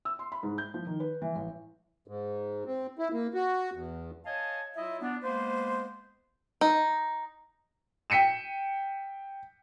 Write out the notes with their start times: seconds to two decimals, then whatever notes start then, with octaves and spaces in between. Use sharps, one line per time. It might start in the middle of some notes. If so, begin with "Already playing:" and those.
0.05 E6
0.19 C6
0.32 B5
0.43 G#2
0.58 G6
0.74 F3
0.87 D#3
1.00 B4
1.22 E3
1.35 A1
2.08 G#2
2.66 C4
2.99 E4
3.12 A#3
3.34 F#4
3.73 E2
4.25 C#5 D#5 F5 G#5 A5
4.76 F#3 E4 F4 D#5 E5
5.01 B3 D4
5.23 G#3 A#3 B3 B4 C5
6.61 D#4
8.10 G5 B6 C#7 D#7 E7